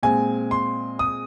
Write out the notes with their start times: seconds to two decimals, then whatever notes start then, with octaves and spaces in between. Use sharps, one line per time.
0.03 A#2 G#3 C4 G#5
0.51 C6
0.99 D#6